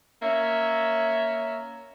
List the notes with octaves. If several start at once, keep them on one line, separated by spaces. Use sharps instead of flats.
A#3 C#4 C#5 E5